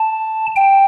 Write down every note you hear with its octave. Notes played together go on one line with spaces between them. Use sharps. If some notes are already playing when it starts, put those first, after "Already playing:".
Already playing: A5
G5